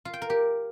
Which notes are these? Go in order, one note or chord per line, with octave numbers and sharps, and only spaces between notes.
F4
G5
A#4
G4